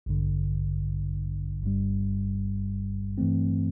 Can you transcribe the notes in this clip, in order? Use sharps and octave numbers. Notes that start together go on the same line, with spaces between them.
A1 G2 D3
G1 G2 G3
G2 E3 A3 C4